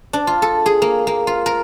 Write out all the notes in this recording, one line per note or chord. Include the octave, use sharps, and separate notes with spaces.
D4
F4
A4
G#4
A#3
A#3
F4
A#4